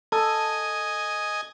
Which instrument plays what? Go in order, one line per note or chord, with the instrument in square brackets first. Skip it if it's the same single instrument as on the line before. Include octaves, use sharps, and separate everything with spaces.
[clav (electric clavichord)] A4 [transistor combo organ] D#5 G#5